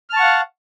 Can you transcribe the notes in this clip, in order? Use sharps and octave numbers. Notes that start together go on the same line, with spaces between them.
F5 F#5 A5 C#6 F6